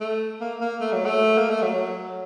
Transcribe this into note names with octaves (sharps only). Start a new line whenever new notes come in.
A3
A#3
A#3
A3
F#3
A3
A#3
A3
F#3